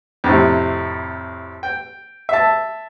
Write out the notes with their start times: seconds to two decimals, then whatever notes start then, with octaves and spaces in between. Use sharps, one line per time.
0.24 F2 A2 C3
1.63 G5
2.29 E5 A5